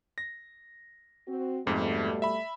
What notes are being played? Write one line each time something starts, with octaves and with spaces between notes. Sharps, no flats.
A#6
C4 F#4
F2 G#2 B2 G3 A3
E5 B5